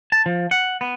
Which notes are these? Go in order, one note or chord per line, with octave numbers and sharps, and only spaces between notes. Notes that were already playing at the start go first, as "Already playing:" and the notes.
A5
F3
F#5
B3